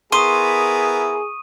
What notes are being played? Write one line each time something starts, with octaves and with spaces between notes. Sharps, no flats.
B3 E4 G#4 A#4 C6 C#6 D#6 D#7